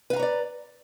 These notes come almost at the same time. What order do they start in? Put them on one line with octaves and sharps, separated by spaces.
B4 F5 A#5 C#5 D5